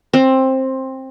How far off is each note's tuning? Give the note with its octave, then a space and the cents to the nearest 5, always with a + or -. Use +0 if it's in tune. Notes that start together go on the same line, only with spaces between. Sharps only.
C4 +15